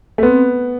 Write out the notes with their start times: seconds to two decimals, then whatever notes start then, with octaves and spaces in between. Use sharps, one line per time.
0.18 A3
0.23 B3 C4